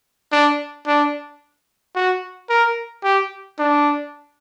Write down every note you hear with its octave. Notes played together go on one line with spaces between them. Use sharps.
D4
D4
F#4
A#4
G4
D4